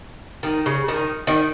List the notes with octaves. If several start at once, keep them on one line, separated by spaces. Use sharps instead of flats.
D#3
C#3
D#3
D#3